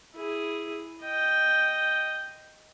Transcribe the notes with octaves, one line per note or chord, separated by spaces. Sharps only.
E4 G#4
D#5 G5